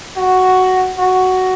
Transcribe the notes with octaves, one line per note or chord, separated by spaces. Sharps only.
F#4
F#4